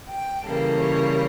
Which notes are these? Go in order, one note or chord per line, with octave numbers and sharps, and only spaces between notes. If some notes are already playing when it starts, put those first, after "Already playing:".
G5
C#3 E3 G3 A#3 A4
C#5